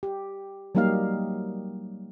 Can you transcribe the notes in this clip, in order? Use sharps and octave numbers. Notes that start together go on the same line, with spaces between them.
G4
F#3 G3 A#3 D#4 G4 F5